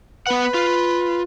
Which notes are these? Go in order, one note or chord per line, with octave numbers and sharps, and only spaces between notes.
B3 B4 F#5
F4